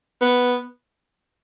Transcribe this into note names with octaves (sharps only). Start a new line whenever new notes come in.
B3